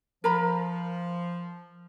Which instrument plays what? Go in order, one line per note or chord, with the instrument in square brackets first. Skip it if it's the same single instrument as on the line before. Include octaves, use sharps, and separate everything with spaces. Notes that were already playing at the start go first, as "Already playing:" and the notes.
[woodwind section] F3 [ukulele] A#4 A#5 B5